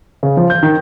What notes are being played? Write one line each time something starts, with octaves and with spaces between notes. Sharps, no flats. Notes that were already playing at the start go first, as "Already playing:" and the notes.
C#3
F3
G6
D#3